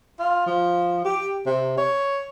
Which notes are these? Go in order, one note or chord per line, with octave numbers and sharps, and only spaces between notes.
F4
F3
G4
C3
C#5